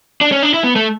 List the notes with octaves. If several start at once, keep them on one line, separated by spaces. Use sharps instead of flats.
D4
C#4
D4
E4
B3
A3